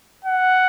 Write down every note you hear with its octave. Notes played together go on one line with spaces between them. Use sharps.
F#5